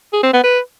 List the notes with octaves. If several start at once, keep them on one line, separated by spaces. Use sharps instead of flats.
G#4
C4
B3
B4